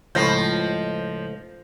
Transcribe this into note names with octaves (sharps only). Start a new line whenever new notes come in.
C#2 A2 F3 G6 A#6 C7